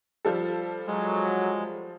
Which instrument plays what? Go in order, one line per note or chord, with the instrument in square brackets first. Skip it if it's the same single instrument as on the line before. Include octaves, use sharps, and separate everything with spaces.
[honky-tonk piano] F3 G3 A4
[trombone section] F#3 [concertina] G#3